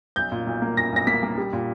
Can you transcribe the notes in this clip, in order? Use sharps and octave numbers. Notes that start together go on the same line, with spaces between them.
B1 G6
A#2
B1
A#3
B1 A#6
B1 A#6
A#3 B6
A#3
G3
A#2